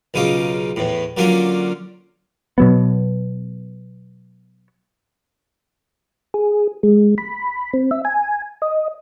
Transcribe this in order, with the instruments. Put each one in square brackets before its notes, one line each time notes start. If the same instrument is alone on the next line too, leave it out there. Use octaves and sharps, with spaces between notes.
[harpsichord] B1 C#3 D#4 F4 D6
E2 A2
D3 F#3 A#3 C#4 D4 F4
[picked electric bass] B2 F#3 B3
[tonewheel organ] G#4
G#3
B5
C4
E5
G#5
D#5